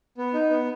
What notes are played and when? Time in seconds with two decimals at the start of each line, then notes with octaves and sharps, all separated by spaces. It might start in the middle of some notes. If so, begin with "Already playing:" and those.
0.18 B3
0.34 D#4
0.50 B3